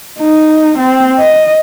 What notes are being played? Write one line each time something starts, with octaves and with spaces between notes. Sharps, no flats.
D#4
C4
D#5